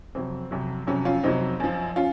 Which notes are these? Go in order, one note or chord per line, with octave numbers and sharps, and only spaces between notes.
F2 C3 F#3 C4
F2 C3 F#3
F2 C3 F#3 C#4
C#4 F4
F2 C3 F#3 C4 D#4
F#2 F3
C#4 F4